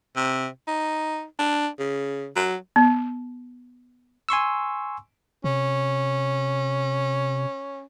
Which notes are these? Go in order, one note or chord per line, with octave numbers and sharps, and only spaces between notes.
C3
D#4
D4
C#3
F#3
B3
G#5 C6 C#6 E6
C3 C#4